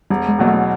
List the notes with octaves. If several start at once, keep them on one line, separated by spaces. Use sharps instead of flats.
E1 G3
G#3
E2 B2 F#3 A#3
A3